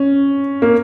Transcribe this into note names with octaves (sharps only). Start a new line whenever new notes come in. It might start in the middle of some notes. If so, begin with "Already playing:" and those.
Already playing: C#4
A#3